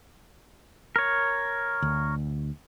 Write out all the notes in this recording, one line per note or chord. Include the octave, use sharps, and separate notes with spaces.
A#4 C#5
D2